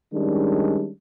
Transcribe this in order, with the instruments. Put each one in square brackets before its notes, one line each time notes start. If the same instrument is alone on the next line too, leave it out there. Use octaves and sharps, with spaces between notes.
[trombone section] D#3 G3 G#3 C#4 D4